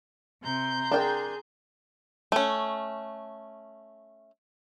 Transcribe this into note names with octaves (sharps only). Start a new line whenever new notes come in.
C3 A#5 C6 G6
D4 G#4 A#4 G5
A3 C#4